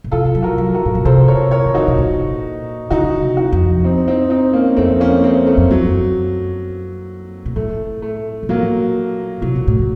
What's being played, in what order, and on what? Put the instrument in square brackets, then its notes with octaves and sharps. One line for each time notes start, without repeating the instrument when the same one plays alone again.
[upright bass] A#2
[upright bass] C3 [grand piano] F4 A4
[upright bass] F#3
[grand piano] F#4 A#4
[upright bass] F#3
[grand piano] F#4 A#4
[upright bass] A2
A#2
[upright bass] C3 [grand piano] A4 C5
[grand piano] A#4 C#5
A#4 C#5
[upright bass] D#3
[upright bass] C#3 [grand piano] D#4 F#4
[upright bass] C3
A#2
[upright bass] C#3 [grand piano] D#4 F#4
[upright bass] C3
[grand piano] D#4 F#4
[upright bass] F2
[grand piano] C4 D#4
C4 D#4
C4 D#4
A#3 C#4
[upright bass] F2 [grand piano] A3 C4
[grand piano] A#3 C#4
A3 C4
A3
[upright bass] F2
[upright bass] F#2 [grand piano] F#3
[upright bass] A#2
[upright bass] A2 [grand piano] A3
[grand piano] A3
[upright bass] C3
[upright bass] A#2 [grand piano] F#3 A#3
[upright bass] C3 [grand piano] F#3
[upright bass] A#2
A2